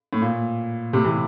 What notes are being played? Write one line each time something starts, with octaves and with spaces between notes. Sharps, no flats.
A2
A#2
A2 C3
C3 E3